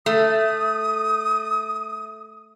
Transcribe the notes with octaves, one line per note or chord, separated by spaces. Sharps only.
A3 D#6